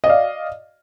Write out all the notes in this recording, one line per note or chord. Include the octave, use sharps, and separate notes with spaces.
D5 D#5 F5